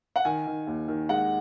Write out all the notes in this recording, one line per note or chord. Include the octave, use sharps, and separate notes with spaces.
F#5
D#3 G#5
D#3
D#2
D#3
G#3 F#5